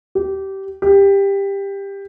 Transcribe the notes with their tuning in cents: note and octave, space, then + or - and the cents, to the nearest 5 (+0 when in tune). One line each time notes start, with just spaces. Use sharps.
G4 -20
G4 +15